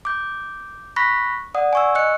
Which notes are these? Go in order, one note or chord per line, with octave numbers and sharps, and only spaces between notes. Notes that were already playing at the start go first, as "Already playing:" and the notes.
D6 G6
B5 C#6 F#6 A#6 B6
D5 F#5 D#6
G#5 C#6 E6
D#5 F#6 C#7